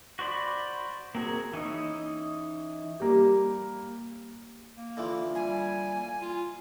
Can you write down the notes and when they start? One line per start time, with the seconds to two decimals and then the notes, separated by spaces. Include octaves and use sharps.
0.19 F#4 C5 D5 B5
1.15 A#3 C4 F#4 G#4 A#4
1.53 E3 C#4 D#4
3.00 G3 A#3 G4
4.78 A#3
4.97 D3 E3 F3
5.35 G3 G#5
5.95 A#3
6.22 F4